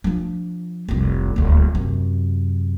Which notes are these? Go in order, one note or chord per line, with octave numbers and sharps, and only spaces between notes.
F3 D4
F1 C2
D#1 D2
F#2 C3